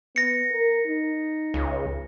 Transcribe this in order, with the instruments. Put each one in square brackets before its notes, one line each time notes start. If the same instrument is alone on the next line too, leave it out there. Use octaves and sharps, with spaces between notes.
[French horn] B3 [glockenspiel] A#6 C#7
[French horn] A#4
D#4
[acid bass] C#2